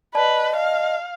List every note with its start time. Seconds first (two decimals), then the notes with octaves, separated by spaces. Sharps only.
0.15 B4 D5 D#5 A5
0.56 F5